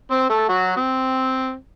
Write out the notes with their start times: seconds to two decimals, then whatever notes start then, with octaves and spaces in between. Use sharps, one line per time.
0.11 C4 C5
0.30 A3 A4
0.49 F#3 F#4
0.77 C4